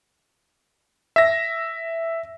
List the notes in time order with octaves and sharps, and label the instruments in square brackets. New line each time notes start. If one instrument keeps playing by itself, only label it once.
[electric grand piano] E5 A#6